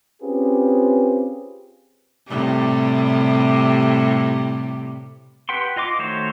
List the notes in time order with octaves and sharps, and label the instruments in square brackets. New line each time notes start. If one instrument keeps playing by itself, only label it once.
[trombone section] C4 C#4 F4 G4 G#4 B4
[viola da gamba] A2 C3 G3
[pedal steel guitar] G4 B4 F#5 G5 C6
F4 D#5 C6 D6
D#3 A3 F#4 C5 C#5